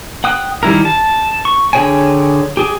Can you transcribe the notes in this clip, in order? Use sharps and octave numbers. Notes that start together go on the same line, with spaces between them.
F#5 G5 D#6 F#6
D#3 G3 E4 A#4
A5
C#6
D3 G#4 C#5 G5 G#5
G4 G#4